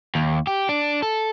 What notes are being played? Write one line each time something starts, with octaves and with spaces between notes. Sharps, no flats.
D#2
G4
D4
A4